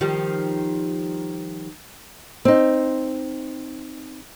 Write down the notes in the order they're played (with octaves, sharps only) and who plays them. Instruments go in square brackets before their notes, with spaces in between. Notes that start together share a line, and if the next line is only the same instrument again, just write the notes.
[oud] D#3 F3 G3
[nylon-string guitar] C4 D#4